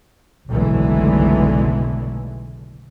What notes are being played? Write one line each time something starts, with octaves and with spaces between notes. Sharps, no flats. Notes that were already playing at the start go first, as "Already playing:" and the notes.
F#1 B1 D3 E3 G#3 A3